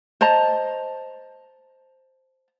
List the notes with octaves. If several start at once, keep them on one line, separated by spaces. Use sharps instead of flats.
C5 D#5 A5 A#5